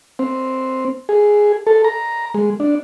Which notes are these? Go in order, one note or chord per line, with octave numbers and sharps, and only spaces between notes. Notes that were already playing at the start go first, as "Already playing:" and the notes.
C4
G#4
A4
A#5
G#3
D4